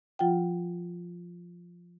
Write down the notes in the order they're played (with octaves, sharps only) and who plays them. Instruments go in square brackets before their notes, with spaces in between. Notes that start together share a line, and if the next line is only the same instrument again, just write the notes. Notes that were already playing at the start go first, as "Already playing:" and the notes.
[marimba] F3 F4 F#5 G5